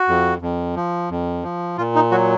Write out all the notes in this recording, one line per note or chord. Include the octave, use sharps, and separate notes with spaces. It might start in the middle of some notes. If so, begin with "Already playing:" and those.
Already playing: F#4
F2
F2
F3
F2
F3
A#2 F4
D#4
F#3 F#4